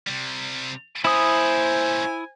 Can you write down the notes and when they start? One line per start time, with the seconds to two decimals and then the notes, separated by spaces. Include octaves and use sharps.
0.07 C3 G3
1.05 A#2 C#4 E4 C5 G#5 D#6